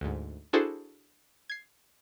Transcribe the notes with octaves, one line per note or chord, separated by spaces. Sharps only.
D2 G#2
D4 E4 F#4 G#4 A4 C5
G#6 C7